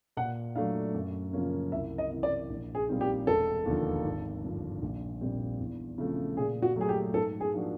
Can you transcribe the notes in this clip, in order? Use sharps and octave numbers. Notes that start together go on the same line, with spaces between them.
A#2 F#5
F#3 A3 D4 F5
F#2
C#3 F3 A#3 C#4
C2 E5
D#5
C3 E3
D5
A#1
G#4
A#2 G3 C4 D#4
G4
E1 A4
D#2 D3 F3 A#3
G#1
G2 D3 F3
A#1
A#2 G3 C4
E2
C#3 F3 A3 C4
A#2 G#4
F#4
F#3 A3 G#4
G4
G#2 A4
G#4
F3 A#3 D4 F#4